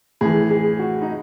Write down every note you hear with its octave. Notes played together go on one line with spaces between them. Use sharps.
A2 E3 G#4
G#4
F#4
D#4